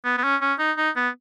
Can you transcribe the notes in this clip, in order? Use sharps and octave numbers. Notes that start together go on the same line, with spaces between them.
B3
B3
C#4
C#4
D#4
D#4
B3